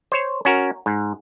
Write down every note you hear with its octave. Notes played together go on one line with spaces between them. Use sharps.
C5 C#5
C#4 F#4 A#4
G#2